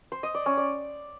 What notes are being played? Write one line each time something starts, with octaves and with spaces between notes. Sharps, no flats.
C5
D#5
D5
C#4
D5